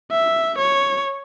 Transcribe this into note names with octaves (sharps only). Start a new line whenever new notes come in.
E5
C#5